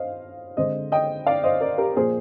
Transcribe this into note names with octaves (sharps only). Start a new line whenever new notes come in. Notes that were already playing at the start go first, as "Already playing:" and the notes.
Already playing: C5 D#5 F5
D3 G#3 C4 C5 D#5
D#5 G5
D5 F5
C5 D#5
A#4 D5
G4 A#4
A#2 F3 A#3 G#4 C5